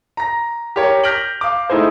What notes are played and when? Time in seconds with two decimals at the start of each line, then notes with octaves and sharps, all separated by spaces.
0.17 A#5 A#6
0.76 G4 A#4 C#5
1.03 F6 G6 A#6 B6 D7 F#7
1.41 F5 D6
1.70 A3 D#4 E4 G#4 C5